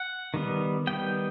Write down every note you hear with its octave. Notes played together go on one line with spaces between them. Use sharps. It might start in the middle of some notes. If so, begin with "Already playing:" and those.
Already playing: F#5
D#3 G3 B3
D#3 G3 B3 G5